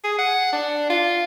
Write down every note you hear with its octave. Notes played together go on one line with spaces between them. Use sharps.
G#4
F#5
D4
F4